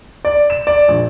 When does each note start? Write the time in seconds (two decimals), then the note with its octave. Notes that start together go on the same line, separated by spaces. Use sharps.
0.25 D5
0.50 E7
0.67 D5
0.88 A#1